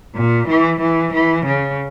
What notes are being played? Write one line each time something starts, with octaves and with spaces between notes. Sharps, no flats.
A#2
E3
E3
E3
C#3